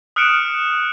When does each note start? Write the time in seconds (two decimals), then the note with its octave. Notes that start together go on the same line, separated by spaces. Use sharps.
0.16 D#6 F6 F#6 C#7 D7 E7